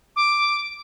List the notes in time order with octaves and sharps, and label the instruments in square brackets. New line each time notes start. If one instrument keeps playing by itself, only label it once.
[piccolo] D6